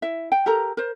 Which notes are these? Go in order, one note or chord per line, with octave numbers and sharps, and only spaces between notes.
E4 E5
G5
G4 A4 A#4 A#5
A#4 C5